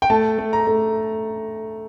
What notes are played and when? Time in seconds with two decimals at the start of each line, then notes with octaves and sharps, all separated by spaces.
0.02 G5
0.10 A3 A5
0.38 A3
0.53 A#5
0.67 A3